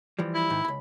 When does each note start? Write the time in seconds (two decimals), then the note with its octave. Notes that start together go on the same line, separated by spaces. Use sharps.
0.19 E3 F3 G3
0.34 E4
0.50 G#2 D#3
0.65 C#2 B5